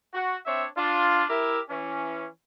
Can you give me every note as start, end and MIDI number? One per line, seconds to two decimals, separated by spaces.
0.14 0.37 66
0.46 0.66 60
0.46 0.66 62
0.46 0.66 73
0.46 0.66 76
0.77 1.25 62
0.77 1.25 65
1.30 1.60 64
1.30 1.60 67
1.30 1.60 70
1.30 1.60 76
1.69 2.26 52
1.69 2.26 61